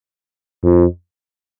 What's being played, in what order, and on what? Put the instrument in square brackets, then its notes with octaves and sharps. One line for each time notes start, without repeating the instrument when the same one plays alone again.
[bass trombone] F2